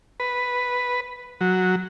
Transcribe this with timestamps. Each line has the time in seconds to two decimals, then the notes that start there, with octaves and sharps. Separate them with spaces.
0.20 B4
1.41 F#3